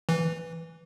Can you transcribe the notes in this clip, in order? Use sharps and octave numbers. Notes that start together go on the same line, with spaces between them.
E3